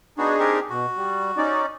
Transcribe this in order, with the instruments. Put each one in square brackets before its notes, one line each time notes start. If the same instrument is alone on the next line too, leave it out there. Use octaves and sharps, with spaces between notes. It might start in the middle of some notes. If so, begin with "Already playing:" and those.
[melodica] B3 F#4 [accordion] D4 D#4 G#4
[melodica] C4 G4 A#4
[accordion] B2 [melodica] F#4
[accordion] G3
C#4 D#4 D5